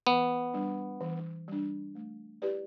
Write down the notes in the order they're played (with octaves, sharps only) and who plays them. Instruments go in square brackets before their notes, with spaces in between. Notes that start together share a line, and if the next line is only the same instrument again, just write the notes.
[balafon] E3 [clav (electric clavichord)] B3
[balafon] G3 D4
E3
G3 D4
A3
E4 G4 B4 D5